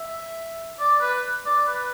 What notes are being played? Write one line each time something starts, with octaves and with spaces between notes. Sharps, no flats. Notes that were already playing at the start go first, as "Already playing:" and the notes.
Already playing: E5
D5
B4
D5
B4